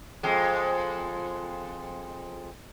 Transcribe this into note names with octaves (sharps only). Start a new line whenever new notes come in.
F2 G#3